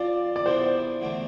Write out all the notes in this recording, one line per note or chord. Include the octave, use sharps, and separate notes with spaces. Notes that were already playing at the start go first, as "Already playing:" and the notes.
Already playing: F3 C4 F4 D5
D5
C3 E3 B3 D4 C5
E2 D3 A3 C4